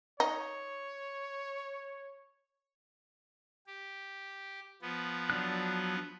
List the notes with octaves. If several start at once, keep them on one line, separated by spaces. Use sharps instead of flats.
D#4 C#5
G4
F3 B3
F#3 D4 F#6